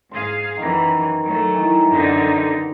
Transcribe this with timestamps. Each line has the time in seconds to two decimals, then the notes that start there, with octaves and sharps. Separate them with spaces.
0.11 G#2 G#4 F5 C6
0.57 F#2 D#3 E3
1.24 F#3 A3 A#4
1.55 D#3 E3
1.90 F#2 D3 D#4